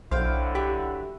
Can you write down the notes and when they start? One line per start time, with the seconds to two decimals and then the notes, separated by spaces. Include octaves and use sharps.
0.11 B1 D3 F#3 E4 C5 F5 G5
0.55 G4 E5 F#6